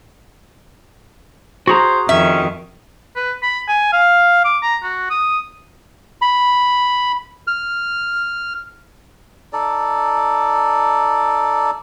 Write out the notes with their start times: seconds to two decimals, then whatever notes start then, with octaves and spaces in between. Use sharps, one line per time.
1.67 F#4 G#4 C5 A#5
2.09 F2 D#3 C#4 E5
3.16 B4
3.43 B5
3.68 G#5
3.93 F5
4.44 D6
4.63 A#5
4.83 F#4
5.10 D#6
6.22 B5
7.47 F6
9.53 D#4 A4 D5